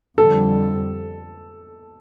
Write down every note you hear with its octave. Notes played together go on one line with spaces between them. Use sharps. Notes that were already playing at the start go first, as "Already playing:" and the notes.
F2 D3 G3 A4